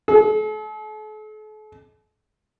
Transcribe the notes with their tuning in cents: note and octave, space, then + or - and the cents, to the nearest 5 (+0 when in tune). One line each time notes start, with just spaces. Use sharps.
A4 -45